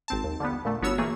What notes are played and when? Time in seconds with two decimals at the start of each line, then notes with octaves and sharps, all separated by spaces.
0.08 G#1 C4 A5
0.24 D#2
0.40 D3 F3 G3 B3
0.65 A#2 D3 A3
0.82 G1 B3 F#4 C#5 E6
0.98 E3 A3 A#3 G#4